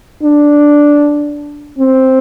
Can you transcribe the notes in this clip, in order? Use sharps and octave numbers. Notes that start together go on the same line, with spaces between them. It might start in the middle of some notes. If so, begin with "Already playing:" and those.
D4
C4